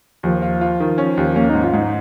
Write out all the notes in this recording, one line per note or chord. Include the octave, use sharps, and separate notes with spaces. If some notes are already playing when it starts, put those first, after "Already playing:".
D#2 F3
F4
F4
D#3
C#4
D#2
A#3 C#4
G#2 D#4
F4
G#2 D#4